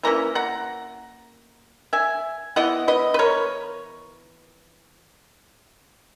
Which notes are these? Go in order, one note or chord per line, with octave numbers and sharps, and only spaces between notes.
E3 A#3 C#4 E4 A#5
F#5 A#5
E5 G#5
E3 B3 E4 D#5 F#5
B4 D#5
B4
A#4 C#5